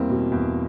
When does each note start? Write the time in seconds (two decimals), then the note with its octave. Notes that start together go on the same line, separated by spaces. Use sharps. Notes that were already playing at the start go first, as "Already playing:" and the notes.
Already playing: E2 G3 A#3 C4
0.09 B2
0.32 E2